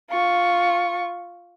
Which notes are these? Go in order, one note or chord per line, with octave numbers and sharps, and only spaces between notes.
F4 C#6